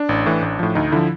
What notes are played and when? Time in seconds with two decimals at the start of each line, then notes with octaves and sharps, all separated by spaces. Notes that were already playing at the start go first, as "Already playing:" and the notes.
Already playing: D4
0.09 A1
0.26 A2 E3
0.42 A1
0.59 A2 F3
0.75 D2 D#4
0.92 D3 F3 E4